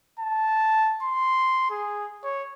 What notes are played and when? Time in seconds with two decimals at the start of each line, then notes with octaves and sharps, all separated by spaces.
0.20 A5
1.03 C6
1.70 G#4
2.24 C#5